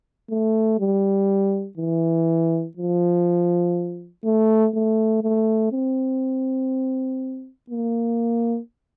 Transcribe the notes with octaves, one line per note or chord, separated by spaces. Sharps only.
A3
G3
E3
F3
A3
A3
A3
C4
A#3